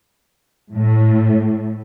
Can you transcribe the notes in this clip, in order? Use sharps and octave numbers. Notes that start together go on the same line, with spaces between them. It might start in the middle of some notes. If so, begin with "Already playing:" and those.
A2